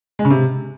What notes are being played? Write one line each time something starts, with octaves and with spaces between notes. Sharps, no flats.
G#3
C#3
C3